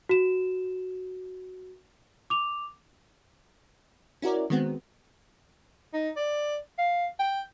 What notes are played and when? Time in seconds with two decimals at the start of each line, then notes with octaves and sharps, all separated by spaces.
0.09 F#4 E7
2.30 D6 F7
4.22 C#4 E4 F#4 A#4 D5
4.50 D#3 G#3 B3 C4 F#4
5.94 D#4
6.17 D5
6.78 F5
7.19 G5